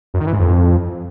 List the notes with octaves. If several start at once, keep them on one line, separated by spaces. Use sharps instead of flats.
F#2
D#3
E3
G#2
F2